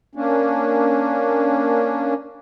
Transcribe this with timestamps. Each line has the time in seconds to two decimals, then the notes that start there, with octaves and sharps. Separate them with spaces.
0.15 A#3 C#4 D4